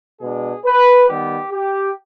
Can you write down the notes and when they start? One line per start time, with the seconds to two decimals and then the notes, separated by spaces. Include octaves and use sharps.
0.20 B2 G#3 D4 G#4
0.64 B4
1.08 D#3 G3 B3 G4
1.51 G4